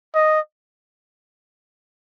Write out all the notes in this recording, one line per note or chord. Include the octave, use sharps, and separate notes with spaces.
D#5